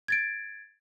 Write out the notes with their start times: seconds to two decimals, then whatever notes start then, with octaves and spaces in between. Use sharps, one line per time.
0.08 G#6 A6 D7